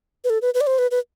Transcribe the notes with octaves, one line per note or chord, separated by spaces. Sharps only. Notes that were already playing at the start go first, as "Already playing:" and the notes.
B4
A4
B4
B4
D5
C5
B4
B4